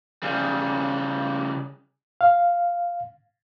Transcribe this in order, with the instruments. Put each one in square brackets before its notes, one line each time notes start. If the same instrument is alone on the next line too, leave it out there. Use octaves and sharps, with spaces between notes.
[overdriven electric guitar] C#3 G3
[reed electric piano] F5